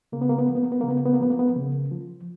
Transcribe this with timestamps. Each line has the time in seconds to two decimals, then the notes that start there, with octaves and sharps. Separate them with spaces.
0.12 C#3 A#3
0.21 B3
0.29 A#3
0.38 B3
0.47 F3 A#3
0.55 B3
0.63 A#3
0.72 B3
0.81 C#3 A#3
0.88 B3
0.97 A#3
1.05 B3
1.14 A#3
1.20 F3 B3
1.30 A#3
1.39 B3
1.47 A#3
1.56 C#3
1.91 F3